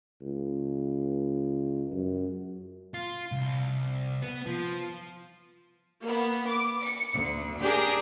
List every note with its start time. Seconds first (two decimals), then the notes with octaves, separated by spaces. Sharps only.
0.22 C#2
1.92 F#2
2.94 F4
3.32 C2
4.22 B3
4.46 F3
6.02 A#3 B3
6.46 D6
6.83 C#7
7.15 D2
7.61 D4 G4 G#4 A#4